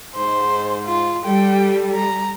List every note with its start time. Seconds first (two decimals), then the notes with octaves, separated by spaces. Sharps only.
0.16 G#2 C5
0.86 F4
1.25 G3 G4 A4 G5
1.95 A#5